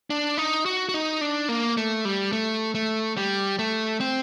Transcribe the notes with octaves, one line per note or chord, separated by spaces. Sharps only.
D4
D#4
F#4
F#4
D#4
D4
A#3
A3
G3
A3
A3
G3
A3
C4